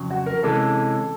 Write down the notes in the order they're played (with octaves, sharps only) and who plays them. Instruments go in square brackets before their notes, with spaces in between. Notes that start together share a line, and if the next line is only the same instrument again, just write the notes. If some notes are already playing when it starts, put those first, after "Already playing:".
Already playing: [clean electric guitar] F2 C#3 F#3
[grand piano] F#4
A#4
[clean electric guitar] C3 E3 G#3 C#4 [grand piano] A4